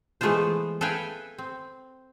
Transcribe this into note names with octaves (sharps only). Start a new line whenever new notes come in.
E3 G#3 A3 B3 F4 C5
A4 B4 E5 F5 G5 G#5
C4